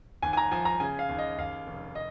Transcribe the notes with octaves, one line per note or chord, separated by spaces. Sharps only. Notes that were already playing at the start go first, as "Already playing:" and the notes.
D#2 G#5
G#5
A#5
F3 G#5
A#5
C#3 G#5
F5
D#2
D#5
D#2 F5
F1
D#5